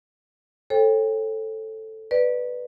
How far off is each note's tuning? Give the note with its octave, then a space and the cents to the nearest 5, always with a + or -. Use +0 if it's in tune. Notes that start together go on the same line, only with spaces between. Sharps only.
A4 +0 C#5 -40 G5 +35
B4 +0 D5 +20